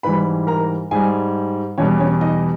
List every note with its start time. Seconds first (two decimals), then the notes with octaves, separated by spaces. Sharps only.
0.03 G#2 E3 G3 B4 B5
0.47 A#4 A#5
0.91 G#2 G3 G#4 G#5
1.78 E2 B2 G3 C#4 C#5
2.00 C#4 C#5
2.21 D#4 D#5